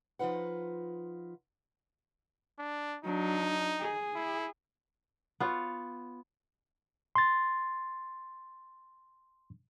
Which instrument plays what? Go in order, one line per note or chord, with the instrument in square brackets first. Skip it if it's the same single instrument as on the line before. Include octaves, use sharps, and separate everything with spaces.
[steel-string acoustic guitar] F3 D#4 F4 B4 F#5
[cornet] D4
[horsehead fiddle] F#3 D4 [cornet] D#4
[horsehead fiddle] G#4
[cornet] E4
[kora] B3 F4 C#5
[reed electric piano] C6 A6